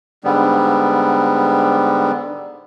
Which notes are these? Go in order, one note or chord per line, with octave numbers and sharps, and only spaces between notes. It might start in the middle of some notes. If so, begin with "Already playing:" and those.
G#2 D3 G3 B3